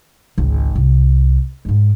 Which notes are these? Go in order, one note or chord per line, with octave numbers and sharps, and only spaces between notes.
G#1 C#2
C2
G#2 G#3